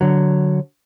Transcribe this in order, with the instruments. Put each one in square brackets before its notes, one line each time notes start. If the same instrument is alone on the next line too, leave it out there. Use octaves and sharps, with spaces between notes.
[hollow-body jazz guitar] D3 F#3